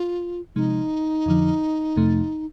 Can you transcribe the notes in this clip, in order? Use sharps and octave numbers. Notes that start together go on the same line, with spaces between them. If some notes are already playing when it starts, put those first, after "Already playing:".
Already playing: F4
C3 F3 G#3 D#4
F2 D3 F3
F2 C3 F3 A3